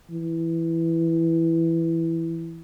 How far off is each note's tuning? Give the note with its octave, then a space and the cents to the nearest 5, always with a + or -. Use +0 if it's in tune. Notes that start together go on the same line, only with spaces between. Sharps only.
E3 +5